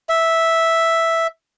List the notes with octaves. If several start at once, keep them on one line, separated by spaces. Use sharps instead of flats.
E5